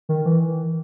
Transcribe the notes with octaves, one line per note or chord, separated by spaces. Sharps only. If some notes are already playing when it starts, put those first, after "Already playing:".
D#3
E3